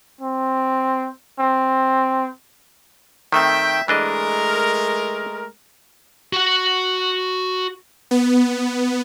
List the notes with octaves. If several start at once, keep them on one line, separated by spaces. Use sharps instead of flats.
C4
C4
D#3 A3 C4 E5 G5
E3 G#3 A3 D4 A#4 D#5
F#4 F#5
B3